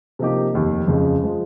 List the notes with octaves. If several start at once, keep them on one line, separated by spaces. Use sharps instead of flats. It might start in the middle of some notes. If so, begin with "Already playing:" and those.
C3 F3 A#3 D#4 G4
F1 D#2 D#3
F2 C#3 G#3
F3 G#3